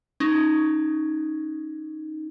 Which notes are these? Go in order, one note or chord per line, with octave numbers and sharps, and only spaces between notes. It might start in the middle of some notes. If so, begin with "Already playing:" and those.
C#4 D#4